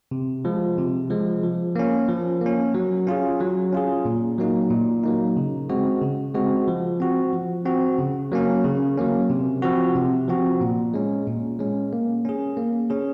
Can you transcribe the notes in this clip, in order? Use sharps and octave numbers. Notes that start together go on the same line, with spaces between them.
C3
F3 G#3
C3
F3 G#3
F3
A#3 C#4
F3
A#3 C#4
F#3
C#4 F4 G#4
F#3
C#4 F4 G#4
A#2
F#3 A#3 D#4
A#2
F#3 A#3 D#4
C#3
G#3 C4 F#4
C#3
G#3 C4 F#4
F3
C4 F#4
F3
C4 F#4
C#3
F#3 A#3 C#4
C#3
F#3 A#3 C#4
C3
F3 C4 F#4
C3
F3 C4 F#4
A#2
G#3 C#4
A#2
G#3 C#4
A#3
C#4 G#4
A#3
C#4 G#4